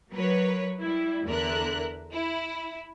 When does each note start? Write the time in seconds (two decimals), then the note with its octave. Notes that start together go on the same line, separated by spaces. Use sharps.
0.12 F#3 A#4 B4 C#5
0.79 G3 E4
1.26 E2 D3 A#4 E5 F#6
2.13 E4